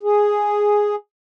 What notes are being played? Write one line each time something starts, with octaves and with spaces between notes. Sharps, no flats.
G#4